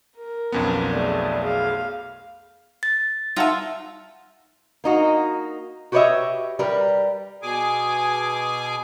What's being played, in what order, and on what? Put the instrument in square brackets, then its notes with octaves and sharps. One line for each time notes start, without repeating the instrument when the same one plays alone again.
[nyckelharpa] A#4
[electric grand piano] B1 F2 B3 [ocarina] C#4
[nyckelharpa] A3 G#4 [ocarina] D5
[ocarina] G#4 [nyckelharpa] F5
[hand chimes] A6
[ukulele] D#4 F#5 A5 [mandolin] F4 E5
[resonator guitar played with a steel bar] A#3 D#4 F#4
F#4 G4 B4 C#5 D#5 E5
G3 A#4 B4
[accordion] B2 G#4 G#5 D6